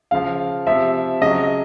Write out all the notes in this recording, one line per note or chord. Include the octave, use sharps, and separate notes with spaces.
C#3 F3 F5
C3 F3 E5
C#3 F#3 D#5